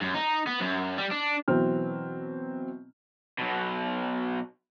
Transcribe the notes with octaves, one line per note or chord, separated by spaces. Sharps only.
F#2
D#4
B3
F#2
G3
D4
B2 E3 F#3 C4 F6
B2 F#3